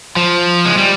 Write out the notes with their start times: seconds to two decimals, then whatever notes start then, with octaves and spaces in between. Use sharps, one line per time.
0.16 F3
0.66 G#3
0.77 G3